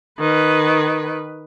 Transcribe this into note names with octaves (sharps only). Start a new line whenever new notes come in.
D#3 B4